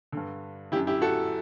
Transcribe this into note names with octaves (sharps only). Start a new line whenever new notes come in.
G2 D3
F#2 D3 E4 G4
E4 G4
F#4 A4